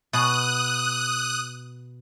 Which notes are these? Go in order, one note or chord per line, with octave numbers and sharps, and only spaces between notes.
B2 D#6 F#6